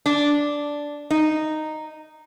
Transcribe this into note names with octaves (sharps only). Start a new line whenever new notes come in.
D4
D#4